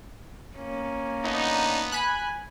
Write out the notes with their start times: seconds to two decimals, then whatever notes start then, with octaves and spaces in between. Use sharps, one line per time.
0.57 A#3 C#4
1.24 D3 B3 D4 D#4
1.92 G#5 B5 F#6